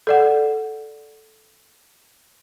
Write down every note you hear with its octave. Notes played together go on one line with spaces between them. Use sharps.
A4 D5 F#5